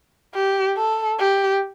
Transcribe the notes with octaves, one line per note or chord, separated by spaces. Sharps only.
G4
A4
G4